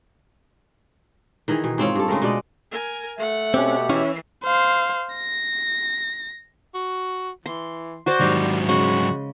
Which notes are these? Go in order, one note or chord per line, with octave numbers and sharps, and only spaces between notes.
D#3 E3 D#4 G#4
B2
G#2 C4 F4 C#5
G2 A4
C#3 G#3 A3 A#4
B2 G#3 D5 D#5
A#4 G#5
A3 E5 F#5
B2 C4 C#4 G4
E3 C#4 E4 C#5
C5 F5
A#6
F#4
E3 C6
F#4 C5 D5
G#2 D#3 F#3 G3
C#3 G#3 F#4